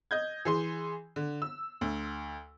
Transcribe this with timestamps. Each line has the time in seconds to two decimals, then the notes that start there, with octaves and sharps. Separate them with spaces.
0.11 D#5 G6 G#6
0.45 E3 G#4 C6
1.16 D3
1.42 E6
1.81 D2